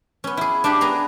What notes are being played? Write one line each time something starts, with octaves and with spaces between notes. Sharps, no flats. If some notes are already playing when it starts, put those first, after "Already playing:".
B3 C#4
E4 G#4
D4 G4
B3 G#4 A#5